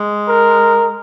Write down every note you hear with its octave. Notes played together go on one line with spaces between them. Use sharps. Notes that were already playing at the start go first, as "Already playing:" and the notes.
Already playing: G#3
A#4